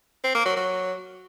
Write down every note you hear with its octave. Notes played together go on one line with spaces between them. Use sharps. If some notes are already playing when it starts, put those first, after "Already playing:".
C4
A#3
F#3
F#3